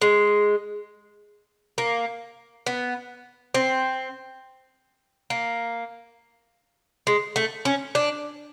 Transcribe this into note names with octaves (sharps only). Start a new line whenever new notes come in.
G#3
A#3
B3
C4
A#3
G#3
A3
C#4
D4